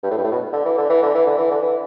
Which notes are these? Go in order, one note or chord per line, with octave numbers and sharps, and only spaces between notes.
G2
A2
G2
A2
B2
D3
E3
D3
E3
D3
E3
D3
E3
D3
E3